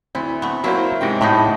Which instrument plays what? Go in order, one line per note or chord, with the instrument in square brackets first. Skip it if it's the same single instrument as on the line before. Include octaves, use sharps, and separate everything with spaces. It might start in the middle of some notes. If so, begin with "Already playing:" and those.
[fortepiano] D2 [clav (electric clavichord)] C4 [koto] E4
[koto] A3 B3
[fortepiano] F#3 A#3 C5 [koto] A3 E4
[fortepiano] G#2 C3 G5
[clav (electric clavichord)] A2 D#4 [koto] B3 E4 G#4